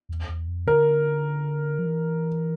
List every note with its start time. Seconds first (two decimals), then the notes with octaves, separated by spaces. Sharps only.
0.09 E2
0.29 E2
0.48 F2
0.67 D3 A#4
1.79 F3
1.86 E3